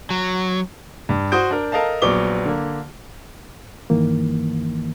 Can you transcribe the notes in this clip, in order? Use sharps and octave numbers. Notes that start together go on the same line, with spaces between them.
F#3
G2
F#4 C5 D#6 G6 D7
D4 A#4
A4 A#4 D#5 F5 A5
A#1 F#3 B3 C#6 D6 G7
D3 A#3
G2 D#3 E3 A#3